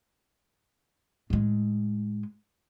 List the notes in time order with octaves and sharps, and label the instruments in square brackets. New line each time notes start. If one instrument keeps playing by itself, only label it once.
[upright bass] A2 G#3